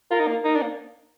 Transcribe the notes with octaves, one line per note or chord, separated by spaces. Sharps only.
F4 A#4
D#4
A#3
D#4 A#4
D4
A#3